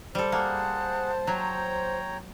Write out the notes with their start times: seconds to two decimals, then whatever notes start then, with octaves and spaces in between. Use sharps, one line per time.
0.15 G3 A4 C5
0.32 A#3 G#4 F#5 A5
1.27 F#3 C#5 G5 A#5